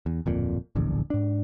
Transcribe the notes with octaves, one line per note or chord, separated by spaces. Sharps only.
E2
D1 F2 A#2
D1 A#1 E2 D3
G#2 D4